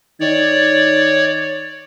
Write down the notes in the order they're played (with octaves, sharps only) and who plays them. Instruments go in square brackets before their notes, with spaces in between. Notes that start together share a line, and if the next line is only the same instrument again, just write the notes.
[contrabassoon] D#3 [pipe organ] C#5 D5